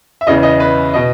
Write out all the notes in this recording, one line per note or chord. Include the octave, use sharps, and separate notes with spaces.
E5
E2 C#3 E3 D#5
D#5
B4
B2 D#5